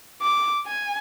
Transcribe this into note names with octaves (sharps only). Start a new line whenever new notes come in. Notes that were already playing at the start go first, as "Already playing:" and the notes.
D6
G#5